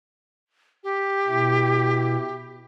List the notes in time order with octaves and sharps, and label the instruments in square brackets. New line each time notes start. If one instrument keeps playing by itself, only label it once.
[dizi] G4
[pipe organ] B2 E4